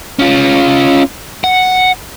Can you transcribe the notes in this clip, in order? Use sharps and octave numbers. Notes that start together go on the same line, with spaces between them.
C#4 F4
F#5